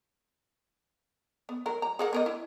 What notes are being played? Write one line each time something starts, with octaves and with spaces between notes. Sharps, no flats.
B3
F#3 A#4
A#5
G#4 A#4 F#5
B3 A#4 D#5
E4